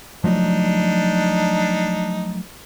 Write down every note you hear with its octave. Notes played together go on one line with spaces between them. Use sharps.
F3 F#3 A3 D4 D#4